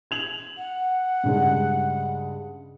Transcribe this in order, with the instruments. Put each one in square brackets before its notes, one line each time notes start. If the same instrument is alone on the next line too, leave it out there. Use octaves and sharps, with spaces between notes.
[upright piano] G#6 F7 F#7
[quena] F#5
[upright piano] G2 C#3 G#3